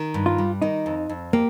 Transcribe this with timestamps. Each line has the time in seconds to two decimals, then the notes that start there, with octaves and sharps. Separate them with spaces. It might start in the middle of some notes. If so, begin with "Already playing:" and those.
Already playing: D#3
0.14 G2
0.26 F4
0.38 G3
0.62 D#3 D#4
0.86 F2
1.09 F2
1.33 A#3 G4